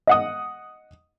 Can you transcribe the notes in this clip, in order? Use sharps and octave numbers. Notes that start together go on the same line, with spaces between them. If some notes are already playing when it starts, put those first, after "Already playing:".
D#5 F#5 D#6